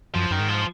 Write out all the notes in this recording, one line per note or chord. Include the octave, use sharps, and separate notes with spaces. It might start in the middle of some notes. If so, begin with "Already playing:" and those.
F#2 F3
F#2 D#3
G#2
F3